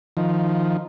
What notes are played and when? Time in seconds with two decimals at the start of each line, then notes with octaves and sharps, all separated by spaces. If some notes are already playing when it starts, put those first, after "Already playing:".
0.17 D#3 F3